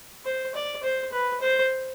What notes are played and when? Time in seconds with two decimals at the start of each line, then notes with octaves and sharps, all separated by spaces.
0.25 C5
0.55 D5
0.83 C5
1.12 B4
1.41 C5